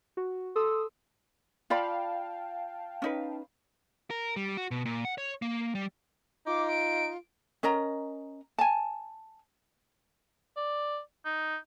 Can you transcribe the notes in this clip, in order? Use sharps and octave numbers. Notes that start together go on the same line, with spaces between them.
F#4
A4 C6 D#6 E6
F4 D5 F5 G5 A5 B5
C#4 D#4 B4
A#4
G3
F#4
B2
A#2
F#5
C#5
A#3
G3
D#4 F4 D6
D7
C#4 A#4 D#5 A#5
G#5 A5
D5
D#4